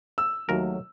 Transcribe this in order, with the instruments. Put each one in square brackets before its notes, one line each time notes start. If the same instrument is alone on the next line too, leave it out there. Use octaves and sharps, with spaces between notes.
[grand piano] E6
[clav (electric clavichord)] D#2 A#4 [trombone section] F#3 A3